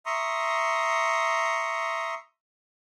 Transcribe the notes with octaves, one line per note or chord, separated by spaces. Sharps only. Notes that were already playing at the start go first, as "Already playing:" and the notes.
E5 A#5 C6 C#6 D#6